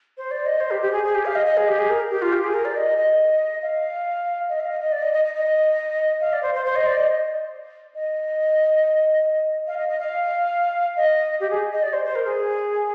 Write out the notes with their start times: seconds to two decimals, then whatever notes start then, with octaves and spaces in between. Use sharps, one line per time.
0.18 C5
0.31 D5
0.46 D#5
0.60 C5
0.71 G4
0.82 G4
0.92 G#4
1.04 G#4
1.15 G4
1.25 F5
1.35 D#5
1.46 D#5
1.57 G#4
1.68 G4
1.79 G#4
1.90 A#4
2.11 G4
2.22 F4
2.32 G4
2.44 G#4
2.54 A#4
2.65 D5
2.77 D#5
2.97 D#5
3.63 F5
4.49 D#5
4.60 F5
4.70 D#5
4.81 D#5
4.92 D5
5.03 D#5
5.13 D#5
5.25 D#5
5.35 D#5
6.21 F5
6.33 D5
6.43 C5
6.55 C5
6.65 C5
6.76 D#5
6.86 D5
6.97 D#5
7.95 D#5
9.67 F5
9.78 D#5
9.89 D#5
9.99 F5
10.97 D#5
11.40 G4
11.50 G#4
11.72 D#5
11.83 D5
11.93 C5
12.05 C5
12.15 A#4
12.26 G#4